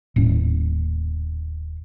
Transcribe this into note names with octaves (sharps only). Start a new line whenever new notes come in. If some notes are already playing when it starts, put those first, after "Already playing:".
D#1 A2 C#4